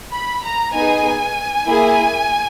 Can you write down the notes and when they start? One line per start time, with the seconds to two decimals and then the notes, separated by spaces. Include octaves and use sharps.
0.11 B5
0.43 A#5
0.73 B3 D#4 G#4 G#5
1.65 A#3 E4 G#4